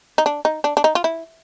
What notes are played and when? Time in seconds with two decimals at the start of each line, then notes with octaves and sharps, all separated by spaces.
0.18 D#4
0.26 D4
0.45 D#4
0.64 D4
0.77 D4
0.84 D#4
0.95 F4
1.04 E4